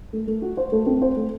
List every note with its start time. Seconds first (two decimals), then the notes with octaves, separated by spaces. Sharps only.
0.13 A3
0.27 A3
0.42 F#4
0.57 C5
0.72 A3
0.87 C4
1.02 C5
1.17 A3